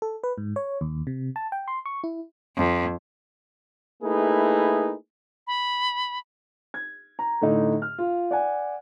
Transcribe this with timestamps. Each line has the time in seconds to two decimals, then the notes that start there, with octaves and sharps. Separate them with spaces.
0.02 A4
0.24 B4
0.38 G#2
0.56 C#5
0.81 D#2
1.07 C3
1.36 A5
1.52 G5
1.68 C6
1.86 C#6
2.04 E4
2.56 F2
4.02 A3 A#3 D#4 E4 G#4 B4
5.47 B5
6.74 G#6
7.19 A#5
7.42 A2 D3 D#4
7.82 F6
7.98 F4
8.31 D5 F#5 G#5